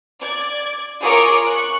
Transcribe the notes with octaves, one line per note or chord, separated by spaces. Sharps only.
D5 G#6
F4 G#4 A#4 C#5 C#6 D6
C#6 F#6